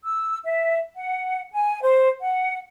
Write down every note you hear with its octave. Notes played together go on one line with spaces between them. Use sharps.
E6
E5
F#5
G#5
C5
F#5